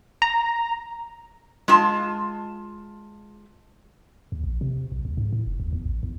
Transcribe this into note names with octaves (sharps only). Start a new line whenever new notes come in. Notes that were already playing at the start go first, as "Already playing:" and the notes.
A#5
G#3 F4 A5
D#2
A#1
C3
B1
D2
G#2
A2
F1
D#2
E2
A1
E2